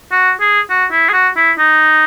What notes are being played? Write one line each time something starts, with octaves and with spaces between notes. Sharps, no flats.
F#4
G#4
F#4
E4
G#4
F#4
E4
D#4